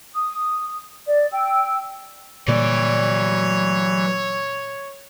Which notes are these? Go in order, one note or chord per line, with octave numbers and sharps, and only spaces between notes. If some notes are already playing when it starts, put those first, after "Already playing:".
D#6
D5
G5 E6
A#2 D3 E3 F#3 G3 C#5 D5